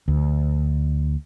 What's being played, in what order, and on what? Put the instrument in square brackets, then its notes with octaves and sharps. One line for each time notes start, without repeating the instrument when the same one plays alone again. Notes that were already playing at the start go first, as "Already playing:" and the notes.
[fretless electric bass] D2